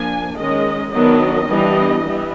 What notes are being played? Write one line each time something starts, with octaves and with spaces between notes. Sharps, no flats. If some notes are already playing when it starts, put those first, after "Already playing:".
Already playing: F3 A#3 D4 G#5
D#3 G#3 C#4 D#5
D#3 F#3 B3 D4 D#5
E3 G3 B3 D4
E3 G3 B3